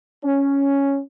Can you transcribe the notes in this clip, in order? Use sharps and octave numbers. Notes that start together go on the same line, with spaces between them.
C#4